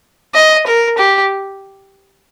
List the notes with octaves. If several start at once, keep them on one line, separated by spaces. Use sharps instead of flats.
D#5
A#4
G4